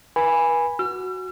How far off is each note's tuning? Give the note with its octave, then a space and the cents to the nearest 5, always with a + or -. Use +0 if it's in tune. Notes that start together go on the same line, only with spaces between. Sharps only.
B4 -40 G#5 -10 B5 +0
F#4 +0 E6 +45